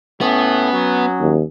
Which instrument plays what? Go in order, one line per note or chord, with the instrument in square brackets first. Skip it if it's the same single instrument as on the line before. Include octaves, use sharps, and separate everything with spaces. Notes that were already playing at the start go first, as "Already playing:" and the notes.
[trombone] A2 [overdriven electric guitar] B3 [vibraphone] C#4 G#5 D#6
[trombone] F#3
[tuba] D#2